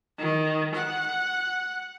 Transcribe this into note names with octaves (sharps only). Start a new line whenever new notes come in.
D#3
F#5